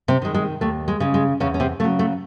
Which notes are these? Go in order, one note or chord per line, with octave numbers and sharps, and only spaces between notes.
C3 C4
D#3 G#3
G#3
D#2 A3
G#3
C#3 G#3
G#3
E2 C#3 C#4
C#4
C3 C4
C#3 F#3 A3
A3